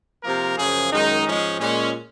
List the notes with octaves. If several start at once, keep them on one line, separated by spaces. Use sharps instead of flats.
C3 F3 A#3 A#4
F#2 C#3 F3 G#4
F#2 D#3 G#3 D#4
G#2 F3 G#3 C#4
A#2 G#3 C#4